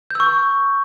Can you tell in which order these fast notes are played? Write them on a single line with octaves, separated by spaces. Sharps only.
G6 E6 C#6